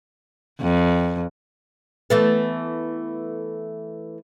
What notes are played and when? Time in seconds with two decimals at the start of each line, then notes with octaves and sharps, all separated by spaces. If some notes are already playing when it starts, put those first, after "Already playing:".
0.61 F2
2.10 E3 A3 B3